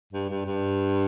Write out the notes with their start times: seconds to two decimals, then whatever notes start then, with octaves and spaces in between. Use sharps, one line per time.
0.13 G2
0.29 G2
0.46 G2